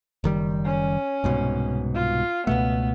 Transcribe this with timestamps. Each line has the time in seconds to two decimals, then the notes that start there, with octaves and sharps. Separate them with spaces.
0.24 F#1 D#3 G3
0.65 C#4
1.24 C2 G#2 B2
1.95 F4
2.47 C#2 B2 A3 B3